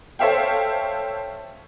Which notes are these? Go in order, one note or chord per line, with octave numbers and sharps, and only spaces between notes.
A4 C5 C#5 E5 F5 G5